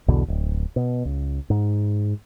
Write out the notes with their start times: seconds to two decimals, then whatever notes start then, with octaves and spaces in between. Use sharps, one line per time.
0.08 B1 E2 B2 D3
0.28 D1
0.76 B2
1.05 C#2
1.50 G#2